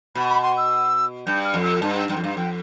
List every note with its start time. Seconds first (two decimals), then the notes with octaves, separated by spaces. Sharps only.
0.15 B2 B5
0.29 B5
0.43 C6
0.57 E6
1.27 G2 G6
1.45 F6
1.54 F2
1.63 E6
1.81 G2 A5
1.95 G5
2.09 G2 G5
2.17 F2
2.24 G2 F5
2.37 F2 G5